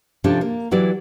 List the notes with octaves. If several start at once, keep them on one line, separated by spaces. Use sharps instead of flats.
C3 F3 C#4 D4 G4 A4
A#3
E3 F#3 E4 G4 D5